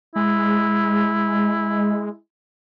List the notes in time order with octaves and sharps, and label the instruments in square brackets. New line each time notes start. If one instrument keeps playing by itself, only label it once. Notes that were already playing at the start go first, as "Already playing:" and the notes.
[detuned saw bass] G#3 [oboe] E4